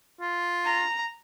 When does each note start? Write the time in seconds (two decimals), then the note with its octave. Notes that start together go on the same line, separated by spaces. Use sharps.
0.21 F4
0.65 A#5